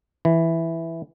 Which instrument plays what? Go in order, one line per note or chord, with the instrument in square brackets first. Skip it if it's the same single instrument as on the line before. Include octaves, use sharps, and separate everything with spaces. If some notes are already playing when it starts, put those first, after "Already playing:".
[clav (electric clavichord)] E3